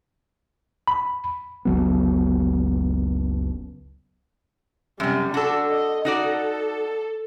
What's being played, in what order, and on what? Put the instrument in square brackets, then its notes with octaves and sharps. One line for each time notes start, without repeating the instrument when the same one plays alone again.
[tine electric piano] B5
[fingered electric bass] F#1 C#2 F#3 B3
[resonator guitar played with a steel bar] F#2 C3 [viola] G3
[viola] D4 [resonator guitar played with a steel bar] F#4 A4
[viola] D#5
[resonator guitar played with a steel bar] D#4 F#4 D5 [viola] A4